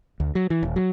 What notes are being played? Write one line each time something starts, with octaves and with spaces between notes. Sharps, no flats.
D2
F#3
E3
D#1
F#3